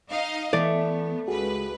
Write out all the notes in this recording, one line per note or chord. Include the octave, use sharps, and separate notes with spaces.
D#4 D#5 F5
E3 A3 B3 D5
C#2 F#4 G#4 B4